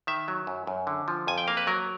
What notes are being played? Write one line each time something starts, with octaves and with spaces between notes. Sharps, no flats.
D#3 E5
F#3
F#2
F#2
D3
F3
F2 G#5
G5
A#3 F5
B4
F#3 A#4